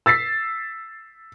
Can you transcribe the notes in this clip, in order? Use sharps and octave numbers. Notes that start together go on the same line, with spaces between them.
E6 A6 B6 C7